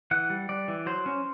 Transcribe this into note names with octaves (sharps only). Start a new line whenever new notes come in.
E3 F#5
G3
G3 D5
E3
F#3 C5
C#4